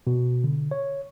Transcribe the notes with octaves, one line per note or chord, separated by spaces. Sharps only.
B2
D3
C#5